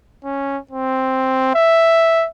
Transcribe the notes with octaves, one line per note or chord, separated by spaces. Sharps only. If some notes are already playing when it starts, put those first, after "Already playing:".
C#4
C4
E5